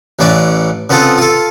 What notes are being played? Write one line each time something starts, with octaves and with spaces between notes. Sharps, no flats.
A1 E3 C#4 D5
C#3 B3 C4 F4 A4
F4 A4